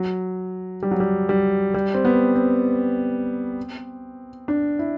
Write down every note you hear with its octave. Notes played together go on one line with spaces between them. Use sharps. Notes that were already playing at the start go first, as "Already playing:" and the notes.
Already playing: F#3
G3
F#3
G3
G3
G3
C4
B3
C4
D4
E4